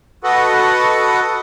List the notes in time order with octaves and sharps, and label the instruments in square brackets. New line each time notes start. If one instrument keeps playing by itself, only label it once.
[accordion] F#4 A4 B4 D#5 F#5